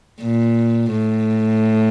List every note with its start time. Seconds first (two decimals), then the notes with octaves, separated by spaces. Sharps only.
0.21 A#2
0.92 A2